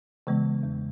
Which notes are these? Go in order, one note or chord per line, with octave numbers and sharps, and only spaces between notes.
C#3 E3 G#3 B3
E2